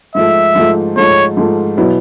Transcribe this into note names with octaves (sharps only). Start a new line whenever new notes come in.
G#2 F3 A3 E5
G#2 F3 A3
G#2 F3 A3 C#5
G#2 F3 A3
B2 F#3 B3 E4